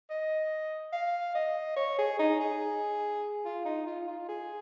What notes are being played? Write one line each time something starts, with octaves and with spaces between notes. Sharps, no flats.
D#5
F5
D#5
C#5
G#4
D#4
G#4
F4
D#4
F4
F4
G#4